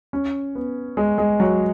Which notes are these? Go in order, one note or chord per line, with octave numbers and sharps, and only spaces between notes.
C#4
B3
G#3
G#3
F#3